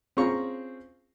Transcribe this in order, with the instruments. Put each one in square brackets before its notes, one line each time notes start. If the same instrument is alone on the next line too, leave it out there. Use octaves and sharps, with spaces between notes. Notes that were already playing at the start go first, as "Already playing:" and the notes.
[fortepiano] C4 C#4 F4 G#4 A#5 C#6